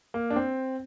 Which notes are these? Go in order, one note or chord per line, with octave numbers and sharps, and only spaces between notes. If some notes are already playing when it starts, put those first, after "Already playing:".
A#3
D4
C4